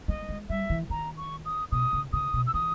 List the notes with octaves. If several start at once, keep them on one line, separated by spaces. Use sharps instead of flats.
G#3 D#5
G#3
G3 E5
E3
D#3 A#5
C#6
D#6
B2 D#6
C#3
C#3 D#6
B2
E6
E3 D#6